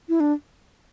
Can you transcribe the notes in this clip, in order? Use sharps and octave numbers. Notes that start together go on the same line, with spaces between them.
E4
D4